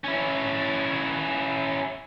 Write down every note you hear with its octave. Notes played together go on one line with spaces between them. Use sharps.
C#4 E4